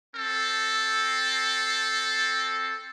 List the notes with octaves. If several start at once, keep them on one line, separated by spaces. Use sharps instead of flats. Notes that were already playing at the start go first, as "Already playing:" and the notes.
C4 A4